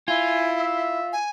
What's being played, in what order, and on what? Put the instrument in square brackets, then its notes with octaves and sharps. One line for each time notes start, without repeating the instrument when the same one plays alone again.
[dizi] E4 [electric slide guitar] F4 [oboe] G#5
[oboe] E5
[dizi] G#5